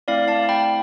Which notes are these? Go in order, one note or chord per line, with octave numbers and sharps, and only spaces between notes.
A3 C4 E4 D5 F5
F5 A5
G5 B5